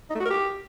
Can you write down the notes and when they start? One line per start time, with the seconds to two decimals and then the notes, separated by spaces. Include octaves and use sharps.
0.10 D#4
0.15 A3
0.20 F#4
0.25 A#4
0.30 G4